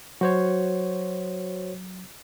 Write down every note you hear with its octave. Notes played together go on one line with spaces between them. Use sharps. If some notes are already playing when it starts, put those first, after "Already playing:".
F#3 F#4 C5 C#5